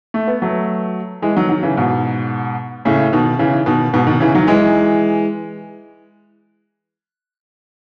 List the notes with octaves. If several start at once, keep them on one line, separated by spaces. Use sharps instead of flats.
A3
B3
F#3 A3
E3 G#3
D#3 F#3
D#3 F#3
C#3 E3
G#2 B2
A2 C#3
B2 D#3
C#3 E3
B2 D#3
G#2 B2
B2 D#3
C#3 E3
D#3 F#3
E3 G#3